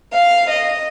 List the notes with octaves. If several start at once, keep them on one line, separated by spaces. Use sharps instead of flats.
F5
D#5